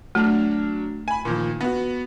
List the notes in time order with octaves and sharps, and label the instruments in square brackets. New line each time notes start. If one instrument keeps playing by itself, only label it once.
[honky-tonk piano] F#3 D4 F6 [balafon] A3
[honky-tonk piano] G#5 B5
A#2 D#3 F3
B3 F#4